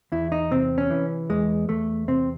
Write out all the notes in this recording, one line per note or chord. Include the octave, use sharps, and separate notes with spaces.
E2 E4
D#4
C3 C4
C#4
E3
E2 G#3
E2 A3
C3 C4